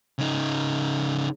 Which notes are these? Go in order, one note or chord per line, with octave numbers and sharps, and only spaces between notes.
C#3 D#4